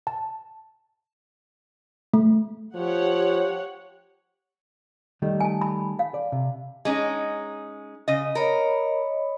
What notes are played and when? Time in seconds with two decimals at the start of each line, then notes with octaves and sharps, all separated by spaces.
0.07 A5
2.13 A3
2.75 F3 G4 C#5 F#5
5.22 D#3 G3 A3
5.40 G#5 A5
5.61 B5
5.99 F5
6.14 D5
6.32 C3
6.85 G#3 C#4 D#4
8.08 C#3 D#5
8.35 A#4 C#5 D#5 B5